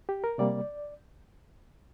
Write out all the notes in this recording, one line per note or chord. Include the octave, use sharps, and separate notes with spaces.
G4
A#4
C3 G3 A#3 D5